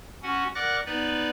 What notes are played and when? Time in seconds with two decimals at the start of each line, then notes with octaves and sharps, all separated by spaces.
0.23 C#4 F#4 F#5
0.55 A#4 D5 F#5 D6 F#6 A#6
0.86 B3 D#4 B4 D5